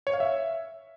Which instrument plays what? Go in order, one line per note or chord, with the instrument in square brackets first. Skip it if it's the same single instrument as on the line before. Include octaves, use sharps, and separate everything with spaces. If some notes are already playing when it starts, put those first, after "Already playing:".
[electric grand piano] C#5
F5
E5